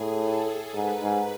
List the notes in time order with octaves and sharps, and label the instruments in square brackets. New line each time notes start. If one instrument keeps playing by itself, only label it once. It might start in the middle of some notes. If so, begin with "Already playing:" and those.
Already playing: [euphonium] A2 [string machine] G#4
[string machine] A4
[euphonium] G#2 [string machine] B4
[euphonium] G#2